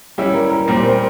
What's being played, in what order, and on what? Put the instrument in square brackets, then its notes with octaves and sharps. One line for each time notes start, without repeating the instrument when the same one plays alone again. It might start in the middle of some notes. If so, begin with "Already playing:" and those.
[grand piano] G3 C#4 E4 [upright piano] G4
[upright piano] A#4
A#4
[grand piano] A#2 G3 C4 [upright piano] A#4
[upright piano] C5